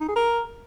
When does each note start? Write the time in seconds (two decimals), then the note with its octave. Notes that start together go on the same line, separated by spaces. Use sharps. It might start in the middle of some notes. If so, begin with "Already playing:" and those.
0.01 D#4
0.08 G#4
0.16 A#4